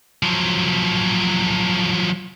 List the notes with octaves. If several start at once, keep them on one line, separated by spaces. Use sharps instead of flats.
F3 F#3